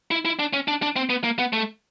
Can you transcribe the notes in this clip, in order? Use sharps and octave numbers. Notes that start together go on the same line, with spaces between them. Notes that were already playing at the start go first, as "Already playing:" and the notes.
E4
E4
D4
C#4
D4
D4
C4
B3
A#3
B3
A3